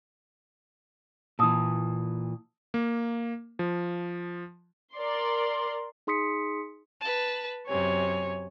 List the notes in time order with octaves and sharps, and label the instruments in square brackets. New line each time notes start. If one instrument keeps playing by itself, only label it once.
[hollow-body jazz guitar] A#2 E3 [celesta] A5 D#6 E6
[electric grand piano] A#3
F3
[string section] A#4 D5 C6
[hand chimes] D#4 G#4 C6 D#6 B6 C#7
[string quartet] B4 A5
[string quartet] F#2 C3 G#5 [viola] C#5